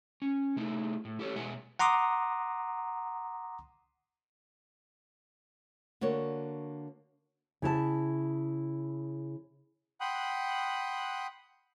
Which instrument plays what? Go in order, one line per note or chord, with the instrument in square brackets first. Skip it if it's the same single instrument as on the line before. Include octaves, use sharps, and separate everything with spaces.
[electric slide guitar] C#4
C3 A3 D#4 E4
A2
E4 G4 A4 A#4 C#5
B2 G#3 B3 E5 F#5 G#5
[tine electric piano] F#5 A#5 C6 D6 D#6
[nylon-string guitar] D3 A#3 F#4 C#5
C#3 E4 D#5 A5
[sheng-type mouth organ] F#5 G5 B5 C6 D#6 F#6